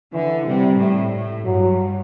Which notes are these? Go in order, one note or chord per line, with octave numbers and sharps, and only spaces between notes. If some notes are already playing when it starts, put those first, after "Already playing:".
D3 E3
C3 G3
A2
A2
G2 F#3